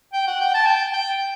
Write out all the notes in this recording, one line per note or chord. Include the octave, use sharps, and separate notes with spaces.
G5
F#5
G5
A5
G5
G5